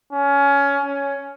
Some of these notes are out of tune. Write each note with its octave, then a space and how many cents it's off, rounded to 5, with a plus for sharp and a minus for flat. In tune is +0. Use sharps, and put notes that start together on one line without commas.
C#4 +20
C#4 +10